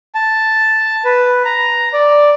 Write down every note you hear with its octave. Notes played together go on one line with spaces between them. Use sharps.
A5
B4
A#5
D5